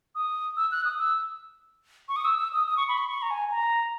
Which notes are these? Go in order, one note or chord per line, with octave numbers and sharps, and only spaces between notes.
D#6
E6
F#6
D#6
E6
C#6
D#6
E6
E6
D#6
D#6
C#6
B5
C#6
C#6
A#5
G#5
A#5